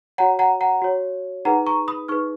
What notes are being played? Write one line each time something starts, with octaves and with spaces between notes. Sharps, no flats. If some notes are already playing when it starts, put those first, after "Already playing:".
F#4 C#5 F#5 A#5
F#5 A#5
F#5 A#5
F#4 C#5
D#4 G#4 B4 F#5 A#5
A#5 C#6
B5 D#6
D#4 G#4 B4 C#6 F6